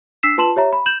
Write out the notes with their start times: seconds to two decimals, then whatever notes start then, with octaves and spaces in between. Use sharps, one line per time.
0.23 D4 E6 B6 C7 E7
0.38 F4 B4 A5 C6 E7 F#7
0.56 G4 C#5 E5 A#5
0.73 B5
0.86 G6 E7 F#7